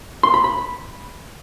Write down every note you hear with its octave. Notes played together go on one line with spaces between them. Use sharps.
C6
B5
B5